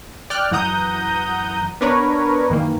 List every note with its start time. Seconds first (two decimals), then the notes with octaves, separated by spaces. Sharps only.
0.30 D5 G5 F6 F#6
0.51 F#2 E3 F#5 A#5 D#6 G6
1.81 B3 D4 A#4 B4 C#5
2.50 F#2 D#3 E3 A#3